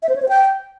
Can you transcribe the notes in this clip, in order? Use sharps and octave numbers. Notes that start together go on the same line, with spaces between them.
E5
C5
C#5
C5
G5